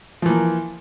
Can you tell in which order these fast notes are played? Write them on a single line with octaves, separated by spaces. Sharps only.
F3 E3 A#3